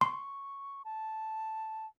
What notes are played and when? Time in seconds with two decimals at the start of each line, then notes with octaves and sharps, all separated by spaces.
0.01 C6 C#6
0.85 A5